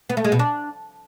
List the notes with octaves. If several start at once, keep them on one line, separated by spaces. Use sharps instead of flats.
B3
A3
G#3
B2
D4